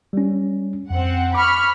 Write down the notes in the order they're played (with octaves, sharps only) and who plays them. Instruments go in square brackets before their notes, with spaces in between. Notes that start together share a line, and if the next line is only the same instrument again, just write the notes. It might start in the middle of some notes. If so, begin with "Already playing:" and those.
[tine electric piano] G3 C#4
[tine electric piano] F2 [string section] C4 F#5
[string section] B5 C#6 F6 [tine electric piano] D6